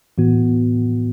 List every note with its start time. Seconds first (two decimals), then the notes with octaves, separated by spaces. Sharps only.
0.18 A2 E3 B3 F#4